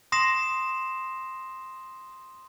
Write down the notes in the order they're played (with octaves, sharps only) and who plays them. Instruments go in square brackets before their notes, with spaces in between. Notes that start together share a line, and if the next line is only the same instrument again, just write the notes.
[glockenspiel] C6 D#6 A#6 C7 E7